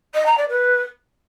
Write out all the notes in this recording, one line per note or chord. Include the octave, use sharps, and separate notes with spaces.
D#5
A#5
D5
B4